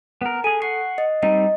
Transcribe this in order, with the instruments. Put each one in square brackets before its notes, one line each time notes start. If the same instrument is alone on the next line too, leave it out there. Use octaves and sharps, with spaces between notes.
[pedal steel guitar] B3 A#4
[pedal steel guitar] G#4 G#5 [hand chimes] A4
[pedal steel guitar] F#5 C#6 [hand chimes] C7
[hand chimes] D#5
[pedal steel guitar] G3 C4 D#4 [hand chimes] D#5